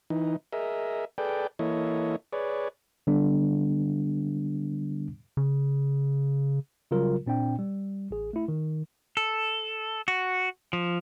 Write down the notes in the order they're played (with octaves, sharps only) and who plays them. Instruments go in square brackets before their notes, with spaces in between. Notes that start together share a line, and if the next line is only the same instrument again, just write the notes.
[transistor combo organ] E3 D#4
G#4 A#4 D#5 E5
G#4 A4 B4 D5 G5
E3 A#3 E4 A4 C#5 D#5
G#4 B4 C#5 D5
[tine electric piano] D3 G3 B3 D4
[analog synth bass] C#3
[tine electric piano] C#3 F#3 G3 F4 A#4
A#2 C4 D4 G5
G3
A1 G#4
A3 E4
D#3
[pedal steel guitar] A4
F#4
F3